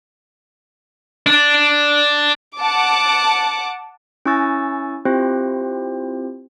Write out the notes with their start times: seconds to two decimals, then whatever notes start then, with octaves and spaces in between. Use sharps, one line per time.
1.27 D4
2.58 F#5 A5 D6
4.26 C#4 E4 G#5 C#6 E6 A6
5.05 C4 E4 F4 G4 C5